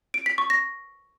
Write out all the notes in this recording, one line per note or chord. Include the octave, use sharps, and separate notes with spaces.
D7
B6
C#6
A#6